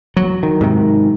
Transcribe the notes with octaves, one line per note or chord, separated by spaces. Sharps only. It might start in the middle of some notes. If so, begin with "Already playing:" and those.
F#3
D#3
G#2 C3 D#3